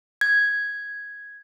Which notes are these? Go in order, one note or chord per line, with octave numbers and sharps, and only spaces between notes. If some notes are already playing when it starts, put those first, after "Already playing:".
G#6